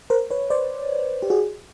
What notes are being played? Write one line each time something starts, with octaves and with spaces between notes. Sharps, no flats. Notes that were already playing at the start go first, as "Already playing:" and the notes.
A#4 C5
B4 C#5
C5 D5
G4
F#4 G#4